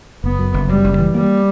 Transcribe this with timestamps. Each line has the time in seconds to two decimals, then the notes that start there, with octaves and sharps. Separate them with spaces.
0.24 F#1 B3
0.39 F#2
0.54 F#1
0.69 F#2 G3
0.84 F#1
0.99 E3
1.14 G3 A#3